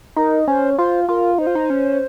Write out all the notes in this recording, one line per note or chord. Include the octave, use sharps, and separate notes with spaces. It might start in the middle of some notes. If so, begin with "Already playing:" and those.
D#4 A#4
C#4 C5
F4 C5
F4 A#4
D#4 C5
F4
D#4
C#4